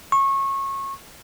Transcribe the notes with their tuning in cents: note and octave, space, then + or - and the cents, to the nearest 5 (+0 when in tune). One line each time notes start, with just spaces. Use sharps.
C#6 -25